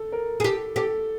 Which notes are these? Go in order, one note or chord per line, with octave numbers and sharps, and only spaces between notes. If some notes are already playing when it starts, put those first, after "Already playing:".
Already playing: A4
A#4
G#4
G4 A4
G4 A4